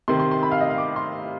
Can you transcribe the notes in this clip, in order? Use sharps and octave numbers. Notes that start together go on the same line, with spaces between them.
C3 D#3 C6
C6
C6
B5
F5
D#5
F5
D6
C6